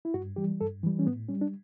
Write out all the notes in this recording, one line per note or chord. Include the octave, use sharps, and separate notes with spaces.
E4
G2 F#4
E3 G3 G4
G2 A4
E3 G3
C#4
A2 B3
G3 C#4
D4